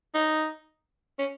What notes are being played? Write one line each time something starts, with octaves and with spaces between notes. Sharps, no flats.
D#4
C#4